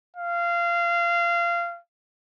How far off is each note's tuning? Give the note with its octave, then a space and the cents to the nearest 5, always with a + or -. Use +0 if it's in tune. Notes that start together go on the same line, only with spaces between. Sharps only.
F5 -20